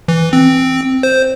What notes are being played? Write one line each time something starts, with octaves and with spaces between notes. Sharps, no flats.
E3
C4
C5